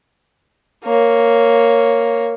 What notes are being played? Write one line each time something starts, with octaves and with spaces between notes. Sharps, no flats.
A#3 C#5